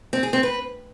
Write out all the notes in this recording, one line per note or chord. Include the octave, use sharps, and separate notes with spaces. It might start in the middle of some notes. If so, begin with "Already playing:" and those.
C4
G#4
C4
B4